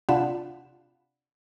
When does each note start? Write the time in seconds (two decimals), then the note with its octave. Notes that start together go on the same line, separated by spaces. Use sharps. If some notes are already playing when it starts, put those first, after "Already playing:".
0.09 C3 D4 F4 F#5 B5 E7